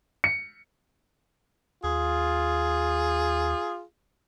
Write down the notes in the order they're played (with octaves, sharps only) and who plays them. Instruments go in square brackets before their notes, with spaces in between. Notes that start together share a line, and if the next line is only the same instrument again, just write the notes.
[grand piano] C#7
[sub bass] D#2 [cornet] F4 [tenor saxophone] G#4